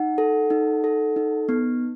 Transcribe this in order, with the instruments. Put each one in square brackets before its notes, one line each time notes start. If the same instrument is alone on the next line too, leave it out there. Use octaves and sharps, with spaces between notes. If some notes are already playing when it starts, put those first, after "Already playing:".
Already playing: [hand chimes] D#4 F#5
A4
D#4
A4
D#4
B3